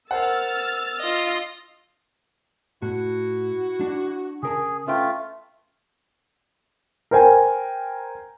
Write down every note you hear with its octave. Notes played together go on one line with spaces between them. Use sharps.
A#4 C5 F#5 E6 F6 A6
F4 D#5
A2 E4 F#4
D4
C#3 G#4 A#4 A5
A3 C#4 F4 B4 G5
A#4 C5 G5 G#5